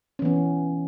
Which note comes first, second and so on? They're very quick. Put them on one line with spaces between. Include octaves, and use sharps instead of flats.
C#4 E3 B3